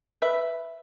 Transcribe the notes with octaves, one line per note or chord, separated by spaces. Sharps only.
B4 E5